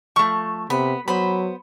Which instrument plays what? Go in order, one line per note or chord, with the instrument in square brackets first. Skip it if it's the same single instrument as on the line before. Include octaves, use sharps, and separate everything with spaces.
[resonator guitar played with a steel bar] F3 A3 [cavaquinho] C#6
[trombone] C3 [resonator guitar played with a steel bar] B3 [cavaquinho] B5
[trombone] F#3 [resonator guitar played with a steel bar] B3 C5 [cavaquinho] B5